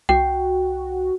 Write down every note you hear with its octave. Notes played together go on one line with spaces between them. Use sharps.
C2 F#4 G5